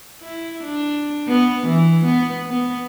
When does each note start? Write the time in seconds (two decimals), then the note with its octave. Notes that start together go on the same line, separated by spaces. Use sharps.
0.21 E4
0.64 D4
1.28 B3
1.67 E3
2.05 B3
2.50 B3